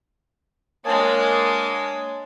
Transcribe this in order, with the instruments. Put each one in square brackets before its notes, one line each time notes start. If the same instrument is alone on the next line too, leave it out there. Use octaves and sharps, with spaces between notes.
[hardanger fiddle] G#3 D4 [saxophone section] A#3 [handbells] C#5 A5 [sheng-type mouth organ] G#5 D#6